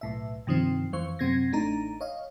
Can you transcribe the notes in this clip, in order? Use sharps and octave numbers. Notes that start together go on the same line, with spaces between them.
B1 A2 E5
G2 C3 D#3 F3 C4
F2 E3 C5 C#6
F#2 C3 C4 G#6 A#6
A1 A3 D4 D#4 A#5
C#5 D#5 F5